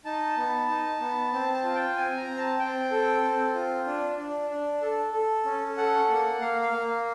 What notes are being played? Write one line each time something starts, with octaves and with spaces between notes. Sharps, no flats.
D#4 A5
B3
D#4
B3
C4 A5
A5
F4
G5
C4 G#5
A#5
C4
A5
C4 G5
A4
C4
F4
D4
D4
D4
A4
A4
C#4
A4 F#5
A#3
A#3 F5
F5
A#3